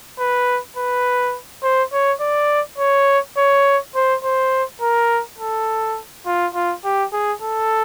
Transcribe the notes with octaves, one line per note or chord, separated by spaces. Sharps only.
B4
B4
C5
C#5
D5
C#5
C#5
C5
C5
A#4
A4
F4
F4
G4
G#4
A4